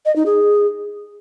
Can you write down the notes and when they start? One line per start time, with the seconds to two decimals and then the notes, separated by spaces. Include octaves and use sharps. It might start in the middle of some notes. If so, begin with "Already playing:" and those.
0.06 D#5
0.16 D#4
0.26 G#4